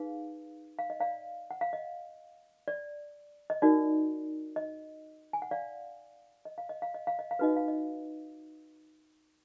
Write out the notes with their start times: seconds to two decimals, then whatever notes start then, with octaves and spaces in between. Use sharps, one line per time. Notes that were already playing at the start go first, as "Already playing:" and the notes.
Already playing: D#4 G#4 B4 F5
0.79 F5
0.90 D#5
1.00 D5 F5
1.51 F#5
1.61 F5
1.73 D#5
2.68 D5
3.50 D#5
3.62 D#4 F#4 A#4 D5
4.56 D#5
5.33 G#5
5.42 F#5
5.51 D5 F5
6.45 D#5
6.58 F5
6.69 D#5
6.82 F5
6.94 D#5
7.07 F5
7.19 D#5
7.31 F5
7.39 D#4 F#4 B4 D#5
7.56 F5
7.68 D#5